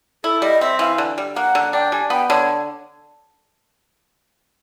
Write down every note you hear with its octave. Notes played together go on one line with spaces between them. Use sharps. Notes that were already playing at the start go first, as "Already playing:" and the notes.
E4 A4
G3 D#5
C4 E5
E3 F5
D3
G3
A#3 F#5
D3
D4 G5
G3 G#5
B3 G5
D3 C#5